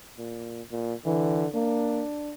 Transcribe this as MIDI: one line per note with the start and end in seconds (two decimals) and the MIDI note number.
0.18 0.62 46
0.72 0.94 46
1.05 1.48 50
1.05 1.45 52
1.54 2.03 58
1.54 2.33 62